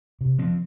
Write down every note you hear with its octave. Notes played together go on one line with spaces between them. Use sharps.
C3
F3 C4